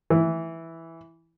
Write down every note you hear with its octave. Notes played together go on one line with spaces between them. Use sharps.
E3